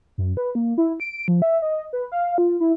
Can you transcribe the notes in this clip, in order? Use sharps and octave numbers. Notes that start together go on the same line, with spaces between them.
F#2
B4
A#3
E4
D7
F3
E5
D#5
B4
F5
F4
E4